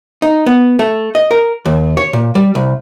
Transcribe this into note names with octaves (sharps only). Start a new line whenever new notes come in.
D#4
B3
A3
D#5
A#4
D#2
C#5
A#2
G3
C2